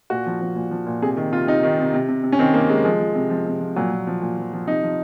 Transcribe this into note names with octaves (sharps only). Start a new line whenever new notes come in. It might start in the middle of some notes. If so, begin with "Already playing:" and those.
A#2 F#4
F3
F3
A#2
F3
A#2
C3 G#4
D#3
C3 F4
C3 D#4
D#3
C3
C3
C3
C3
C#4
D#3 C4
D#3 A#3
C3 G#3
F3 G#3
F3
C3
F3
C3
F3
A#2 F#3
A#2
F3
A#2
F3
F3
C3 D#4
F3